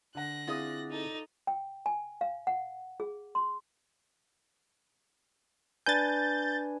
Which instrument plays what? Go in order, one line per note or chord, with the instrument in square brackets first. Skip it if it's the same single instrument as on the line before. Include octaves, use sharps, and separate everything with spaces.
[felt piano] D3 F#5 [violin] F#6 A#6
[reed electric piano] C4 E4 G#4 [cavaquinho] F4 D5 D#6
[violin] D#4 A4
[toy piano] G5
G#5
F5
F#5
G#4
C6
[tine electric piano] D4 B4 G#5 [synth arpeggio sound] G6 A6